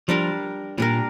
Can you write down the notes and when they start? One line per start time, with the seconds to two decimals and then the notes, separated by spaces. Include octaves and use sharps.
0.08 F3 G3 D4 A#4
0.78 A#2 G3 D4 A#4